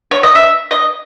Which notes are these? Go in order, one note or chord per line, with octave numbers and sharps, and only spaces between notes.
C#5
D#5
E5
D#5